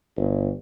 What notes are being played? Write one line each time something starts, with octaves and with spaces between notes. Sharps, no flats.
G1